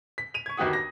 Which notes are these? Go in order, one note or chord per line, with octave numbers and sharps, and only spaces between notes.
B6
D#7 F7
C#6 G#6
G1 D#2 F#4 G4 F#5 D#6
A#6